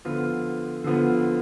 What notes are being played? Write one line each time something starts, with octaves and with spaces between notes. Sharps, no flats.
D3 F3 B3 F4
D3 F3 B3 F4